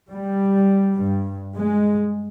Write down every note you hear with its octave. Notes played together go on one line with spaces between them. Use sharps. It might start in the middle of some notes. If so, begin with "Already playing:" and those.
G3
G2
G#3